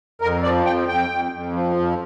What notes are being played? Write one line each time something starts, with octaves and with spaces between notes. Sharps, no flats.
F2 A#4
F3 D5
F2 G5
F2 G5
F2
F2
F3
F2